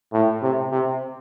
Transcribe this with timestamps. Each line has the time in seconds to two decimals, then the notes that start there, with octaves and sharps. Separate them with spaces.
0.13 A2
0.43 C3
0.71 C3